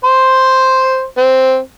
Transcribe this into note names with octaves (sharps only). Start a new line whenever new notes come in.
C5 C6
C4